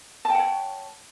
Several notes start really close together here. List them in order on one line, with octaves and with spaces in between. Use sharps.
A5 G5 F#5 C#5